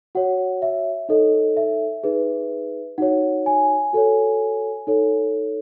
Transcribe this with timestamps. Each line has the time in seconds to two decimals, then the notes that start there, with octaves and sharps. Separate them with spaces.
0.15 F#4 C#5 F#5
0.62 E5
1.09 D#4 A4 C#5 D#5
1.57 E5
2.04 D#4 G#4 B4
2.98 D#4 F#4 C#5 F#5
3.46 G#5
3.93 F#4 A4 C#5
4.87 D#4 A4 C#5